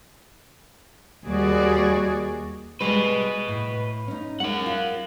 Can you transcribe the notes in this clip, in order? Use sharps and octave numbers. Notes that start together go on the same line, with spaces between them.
D#2 G3 F#4 G#4 D5
G3 G#3 G4 B4 D#5
A2
C#4 D#4
G#3 C#4 A#4 F#5
F4